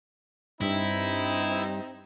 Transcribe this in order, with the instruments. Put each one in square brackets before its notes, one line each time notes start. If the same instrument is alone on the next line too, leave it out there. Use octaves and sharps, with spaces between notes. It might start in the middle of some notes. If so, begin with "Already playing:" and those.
[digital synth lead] G2 [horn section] C4 D#4 [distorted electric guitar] E4